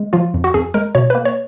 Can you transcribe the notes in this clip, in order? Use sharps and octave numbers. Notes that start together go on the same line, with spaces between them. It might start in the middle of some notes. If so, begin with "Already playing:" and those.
Already playing: G#3
F3 F4
F2
F#4
F2 G#4
G#3 A#4
B2 C#5
A#3 B4
C#5